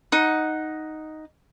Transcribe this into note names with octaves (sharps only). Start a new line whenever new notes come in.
D#4 F#5